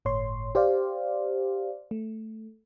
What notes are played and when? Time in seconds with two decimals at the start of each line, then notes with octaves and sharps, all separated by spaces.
0.05 G1 A2 C#5 C6
0.55 G4 C5 D5 F5
1.91 A3